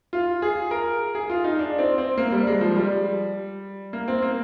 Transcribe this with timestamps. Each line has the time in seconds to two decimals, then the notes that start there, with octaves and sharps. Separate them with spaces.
0.13 F4
0.42 G#4
0.71 A#4
1.15 G#4
1.30 F4
1.44 D#4
1.59 D4
1.79 C4
1.98 C4
2.18 A#3
2.32 G3
2.47 G#3
2.61 F3
2.76 G3
3.93 A#3
4.08 C4
4.22 A#3